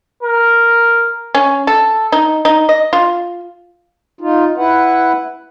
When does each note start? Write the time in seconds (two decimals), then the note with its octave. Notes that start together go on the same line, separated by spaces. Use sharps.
0.23 A#4
1.35 C#4
1.67 A4
2.12 D#4
2.45 D#4
2.69 D#5
2.93 F4
4.21 D#4 F4
4.58 E4 B4 F#5